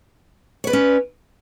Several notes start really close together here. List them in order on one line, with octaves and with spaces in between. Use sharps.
C#5 B4 D5 C#4